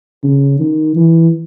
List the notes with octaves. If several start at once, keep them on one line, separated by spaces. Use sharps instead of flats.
C#3
D#3
E3